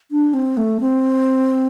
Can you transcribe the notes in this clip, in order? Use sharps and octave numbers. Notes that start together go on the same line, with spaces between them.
D4
C4
A3
C4